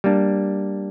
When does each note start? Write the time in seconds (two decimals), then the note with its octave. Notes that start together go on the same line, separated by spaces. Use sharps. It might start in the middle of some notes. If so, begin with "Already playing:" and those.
0.04 G3 A#3 D4